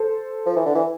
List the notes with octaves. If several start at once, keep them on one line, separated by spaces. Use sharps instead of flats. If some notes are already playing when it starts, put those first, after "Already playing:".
Already playing: A4 C5
F3
E3
D3
E3